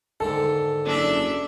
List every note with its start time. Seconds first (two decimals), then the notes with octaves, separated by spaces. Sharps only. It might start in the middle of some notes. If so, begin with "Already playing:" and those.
0.20 G#2 D3 D#3 A4
0.85 F#1 D4 E5